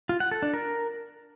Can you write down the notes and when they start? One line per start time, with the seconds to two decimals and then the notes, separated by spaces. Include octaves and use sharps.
0.09 F4
0.20 F#5
0.31 A4
0.42 D4
0.54 A#4